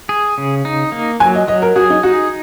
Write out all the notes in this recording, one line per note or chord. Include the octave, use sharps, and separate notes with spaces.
G#4
C#3
D#4
A#3
F#3 G#5
D#5
F#3 D#5
A#4
F#4 G#4
D#4
D#4 F#4